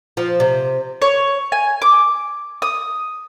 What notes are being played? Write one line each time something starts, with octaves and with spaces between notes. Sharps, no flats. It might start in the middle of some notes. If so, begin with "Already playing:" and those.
F3
C3
C#5
G#5
D6
D#6